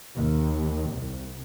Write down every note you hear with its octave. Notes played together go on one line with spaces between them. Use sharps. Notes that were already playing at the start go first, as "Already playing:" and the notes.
D#2
C2